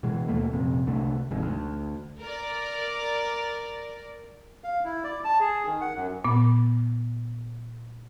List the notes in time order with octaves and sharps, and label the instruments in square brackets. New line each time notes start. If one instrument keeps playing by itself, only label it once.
[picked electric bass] B2 E3 G#3
D#2 B2 A3 A#3
A#1 F2 C3
C2 D3 A3
F1 F2 G#2
D2
[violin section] A#4 D5
[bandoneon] F5
E4
D5
A5
G#4
D#3
F#5
F#2
[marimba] A#2 B3